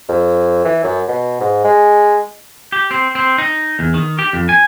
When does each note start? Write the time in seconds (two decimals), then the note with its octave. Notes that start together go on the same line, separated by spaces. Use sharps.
0.08 F2
0.64 E3
0.83 F#2
1.08 B2
1.40 G#2
1.64 G#3
2.72 G4
2.91 C4
3.15 C4
3.38 D#4
3.79 E2
3.94 D#3
4.19 G4
4.33 F2
4.49 G#5